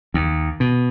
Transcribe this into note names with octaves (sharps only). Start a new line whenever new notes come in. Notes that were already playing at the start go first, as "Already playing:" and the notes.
D#2
B2